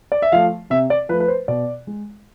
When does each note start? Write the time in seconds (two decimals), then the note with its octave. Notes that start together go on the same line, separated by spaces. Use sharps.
0.12 D5
0.22 E5
0.32 F3 A3 F5
0.70 C3 E5
0.90 D5
1.09 F3 B4
1.12 A3
1.20 B4
1.28 C5
1.48 B2 D5
1.87 G#3